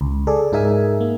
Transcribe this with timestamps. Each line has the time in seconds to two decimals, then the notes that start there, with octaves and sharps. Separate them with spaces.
0.01 C#2
0.27 G#4 A4 D5
0.52 G#2 D#4 G#4 A#4 E5 G#5
1.01 A#3